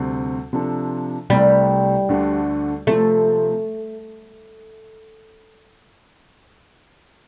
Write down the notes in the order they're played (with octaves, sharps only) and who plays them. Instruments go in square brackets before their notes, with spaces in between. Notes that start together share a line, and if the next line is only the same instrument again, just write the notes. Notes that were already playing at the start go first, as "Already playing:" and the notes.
Already playing: [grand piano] D2 C3 G3 C4
C3 F3 D4 A4
[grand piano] C2 C3 A3 C4 G4 [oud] G3
[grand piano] D2 D3 A3 D4
[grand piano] C3 F3 C4 [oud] A3